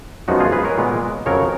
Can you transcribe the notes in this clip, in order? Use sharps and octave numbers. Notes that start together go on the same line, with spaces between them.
F#2 F3 G#3 B3 D#4 F#4
F4 G#4
G#4 B4
A#4 C#5
A#2 G#3 B3
F2 C#3 F#3 A#4 C#5